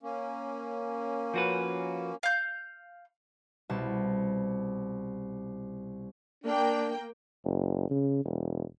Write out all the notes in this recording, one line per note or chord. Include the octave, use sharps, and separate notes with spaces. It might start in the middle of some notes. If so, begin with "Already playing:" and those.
A#3 C#4
F3 F#4 B4
F5 G6
C2 B2 A5
A#3 D4 G5
F#1
C#3
E1